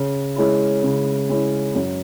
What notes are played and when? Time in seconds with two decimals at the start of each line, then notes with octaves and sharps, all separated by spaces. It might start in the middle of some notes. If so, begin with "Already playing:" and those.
Already playing: C#3
0.36 G#3 C#4 E4
0.83 C#3
1.29 G#3 C#4 E4
1.75 F#2